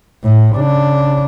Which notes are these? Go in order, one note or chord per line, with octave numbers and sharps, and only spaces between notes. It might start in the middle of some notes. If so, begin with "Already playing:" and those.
A2
C#3 D4